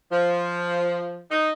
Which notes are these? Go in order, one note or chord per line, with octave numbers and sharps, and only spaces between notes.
F3
D#4